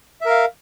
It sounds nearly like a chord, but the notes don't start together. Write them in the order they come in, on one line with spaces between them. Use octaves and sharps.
E5 A#4 F5